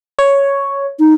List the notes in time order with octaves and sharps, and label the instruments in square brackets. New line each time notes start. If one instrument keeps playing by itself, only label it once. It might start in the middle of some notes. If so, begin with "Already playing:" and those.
[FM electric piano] C#5
[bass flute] D#4